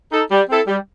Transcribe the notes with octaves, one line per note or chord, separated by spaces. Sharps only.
D#4 A4
G3
C4 E4 A4
G3